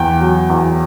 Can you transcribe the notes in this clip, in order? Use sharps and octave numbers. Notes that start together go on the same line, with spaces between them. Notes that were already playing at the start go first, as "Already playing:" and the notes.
Already playing: E2 G5
F#3
E2